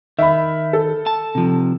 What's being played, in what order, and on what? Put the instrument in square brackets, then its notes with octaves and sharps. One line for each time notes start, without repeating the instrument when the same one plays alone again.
[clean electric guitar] D#3 [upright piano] E5 B5
[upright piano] A4
[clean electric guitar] A5
C3 F3